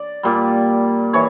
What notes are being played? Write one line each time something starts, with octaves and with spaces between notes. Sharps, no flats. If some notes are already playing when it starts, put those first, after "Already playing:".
Already playing: D5
A#2 G3
E3 C#5